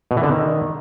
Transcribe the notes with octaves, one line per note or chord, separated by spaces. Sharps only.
B2
E3
D3
D#3